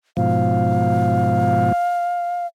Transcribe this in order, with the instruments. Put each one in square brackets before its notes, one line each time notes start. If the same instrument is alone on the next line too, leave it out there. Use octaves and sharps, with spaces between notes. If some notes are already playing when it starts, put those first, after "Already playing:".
[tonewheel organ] G#2 B2 F3 [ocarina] F5